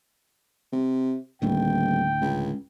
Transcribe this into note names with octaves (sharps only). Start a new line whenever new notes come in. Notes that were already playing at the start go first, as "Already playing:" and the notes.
C3
D#1 D2 A2 D3 G5
C#2